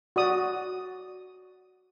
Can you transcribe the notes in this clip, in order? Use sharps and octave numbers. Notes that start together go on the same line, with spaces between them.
F#4 D5 D#6